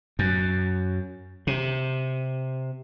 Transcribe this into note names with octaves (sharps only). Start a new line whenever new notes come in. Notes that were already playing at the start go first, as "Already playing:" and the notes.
F#2
C3